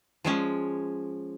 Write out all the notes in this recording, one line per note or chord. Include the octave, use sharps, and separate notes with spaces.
F3 G#3 C#4